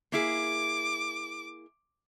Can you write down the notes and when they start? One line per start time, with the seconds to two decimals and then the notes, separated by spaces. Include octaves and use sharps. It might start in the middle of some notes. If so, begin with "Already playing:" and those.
0.12 A#3 E4 G#4 D6